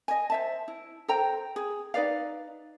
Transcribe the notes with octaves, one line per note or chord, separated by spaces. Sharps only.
D#5 G#5
C5 E5 A5
E4
A4 C5 G5 A#5
G#4
D#4 B4 D5 F5